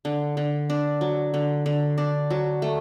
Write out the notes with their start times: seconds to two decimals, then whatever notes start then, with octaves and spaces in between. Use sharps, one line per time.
0.05 D3
0.37 D3
0.70 D4
1.01 F#3
1.34 D3
1.66 D3
1.98 D4
2.30 F#3
2.62 A3